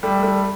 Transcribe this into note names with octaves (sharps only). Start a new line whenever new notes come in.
G3 A3
G3 A3